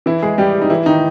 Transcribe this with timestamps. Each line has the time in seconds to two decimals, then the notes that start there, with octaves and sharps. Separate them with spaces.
0.06 E3 E4
0.22 G#3 G#4
0.38 G3 G4
0.62 D#4
0.70 E3 E4
0.86 D#3 D#4